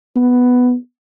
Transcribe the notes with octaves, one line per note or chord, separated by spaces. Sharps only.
B3